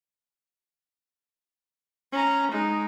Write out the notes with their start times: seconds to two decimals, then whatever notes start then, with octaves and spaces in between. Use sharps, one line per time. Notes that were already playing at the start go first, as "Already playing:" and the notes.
2.12 C#4 A#5
2.51 G#3 D#4